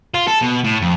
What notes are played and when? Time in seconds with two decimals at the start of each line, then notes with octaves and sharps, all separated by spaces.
0.14 F4
0.28 A4
0.42 B2
0.64 A2
0.82 F2